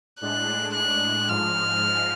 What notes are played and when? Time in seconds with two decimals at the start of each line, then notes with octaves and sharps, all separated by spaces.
0.21 A2 G#3 D4 F#6
0.74 F#6
1.28 G#2 F3 G#3 F6